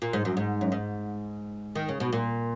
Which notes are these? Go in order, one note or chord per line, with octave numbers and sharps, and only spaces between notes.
A#2
G#2
F#2
G#2
F#2
G#2
D#3
C#3
B2
A#2